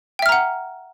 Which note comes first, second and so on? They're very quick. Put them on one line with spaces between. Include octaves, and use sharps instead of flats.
G5 E5 F6 A#5 F#5